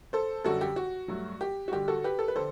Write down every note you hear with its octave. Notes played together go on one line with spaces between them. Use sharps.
A4 C5
F#2 D3 G3 F#4 A4
G4
F#4
G2 F#3 A3
G4
F#4
G2 D3 G3 G4
F#4 A4
G4 B4
A4
B4
D3 A4 C5